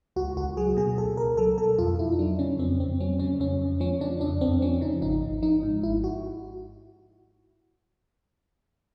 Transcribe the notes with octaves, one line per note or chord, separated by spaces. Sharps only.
C#2 F#4
C#2 F#4
F#3 G#4
B2 G#4
C#2 A4
C#2 A#4
F#3 A4
B2 A4
F2 F4
F2 E4
D#4
F#3 D4
C#3 C#4
F2 C4
F2 C4
F#3 C#4
C#3 C#4
F2 C#4
F2
F3 C#4
C#3 D4
F2 D4
F2 C4
F3 C#4
C#3 D#4
G#1 D#4
G#1
F3 D#4
G#2
G#1 E4
F#4